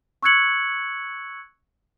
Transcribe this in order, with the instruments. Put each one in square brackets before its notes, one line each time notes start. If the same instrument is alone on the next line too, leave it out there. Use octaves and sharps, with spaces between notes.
[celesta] C#6 E6 F#6 G#6 C#7 F#7